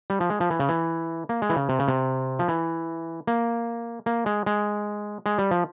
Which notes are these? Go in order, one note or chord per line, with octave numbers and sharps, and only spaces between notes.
G3
F3
G#3
F3
E3
C#3
E3
A#3
G#3
E3
C#3
C3
C#3
C3
F3
E3
A#3
A#3
G#3
G#3
G#3
G3
F3